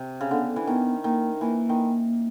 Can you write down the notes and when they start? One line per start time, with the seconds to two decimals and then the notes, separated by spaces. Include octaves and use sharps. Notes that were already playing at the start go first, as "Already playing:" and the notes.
Already playing: C3
0.21 C#3
0.31 D3 B3
0.56 E3
0.67 D#3 B3
1.04 D#3 A#3
1.41 E3 A#3
1.69 D#3